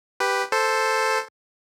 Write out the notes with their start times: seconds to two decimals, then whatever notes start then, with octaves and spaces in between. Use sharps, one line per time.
0.20 G4 B4
0.52 A4 C5